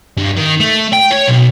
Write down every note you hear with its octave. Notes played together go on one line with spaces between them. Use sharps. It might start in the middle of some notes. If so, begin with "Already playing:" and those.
G2
D#3
A3
G5
C#5
B1